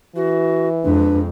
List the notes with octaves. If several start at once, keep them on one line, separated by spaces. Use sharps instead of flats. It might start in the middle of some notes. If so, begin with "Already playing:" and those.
E3 F#4
F2 G#3 D4 B4